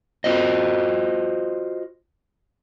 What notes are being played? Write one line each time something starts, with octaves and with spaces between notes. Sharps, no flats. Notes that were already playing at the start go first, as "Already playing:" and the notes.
F4 F#4 C5 D#5